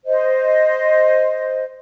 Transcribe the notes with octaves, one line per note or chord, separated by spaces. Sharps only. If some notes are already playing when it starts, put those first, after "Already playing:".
C5 D#5